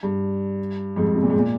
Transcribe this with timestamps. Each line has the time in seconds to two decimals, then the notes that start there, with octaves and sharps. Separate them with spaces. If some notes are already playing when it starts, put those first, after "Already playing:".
0.03 G2
0.96 F2 G#2
1.15 C3
1.23 A#2
1.30 G#2
1.38 A#2